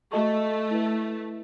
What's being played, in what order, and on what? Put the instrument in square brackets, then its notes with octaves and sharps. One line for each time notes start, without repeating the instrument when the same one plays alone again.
[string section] A3 [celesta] F#4 A4 D#5 A5 C#6
[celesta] E4 B4 E5